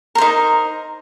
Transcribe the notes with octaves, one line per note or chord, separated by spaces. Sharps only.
D#4 A#4 C5